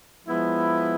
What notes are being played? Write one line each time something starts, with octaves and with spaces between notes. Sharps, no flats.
F3 G#3 B3 E4